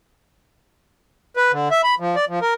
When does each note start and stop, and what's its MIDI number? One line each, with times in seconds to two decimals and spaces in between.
1.37 1.52 71
1.52 1.68 50
1.71 1.81 76
1.84 1.95 83
2.00 2.16 53
2.16 2.25 74
2.29 2.39 53
2.42 2.54 70